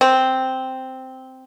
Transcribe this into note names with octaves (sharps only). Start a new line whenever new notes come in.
C4